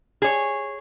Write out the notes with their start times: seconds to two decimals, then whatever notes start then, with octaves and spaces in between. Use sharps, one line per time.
0.22 G#4 C#5